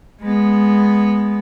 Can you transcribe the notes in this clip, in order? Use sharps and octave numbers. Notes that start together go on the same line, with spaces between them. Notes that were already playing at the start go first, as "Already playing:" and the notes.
G#3 B3